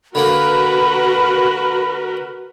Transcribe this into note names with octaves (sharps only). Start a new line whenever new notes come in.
D3 A#3 F#4 A#4 B4 B5